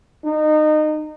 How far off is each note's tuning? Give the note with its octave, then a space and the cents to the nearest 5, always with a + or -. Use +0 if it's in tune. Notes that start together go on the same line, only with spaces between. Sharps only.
D#4 -25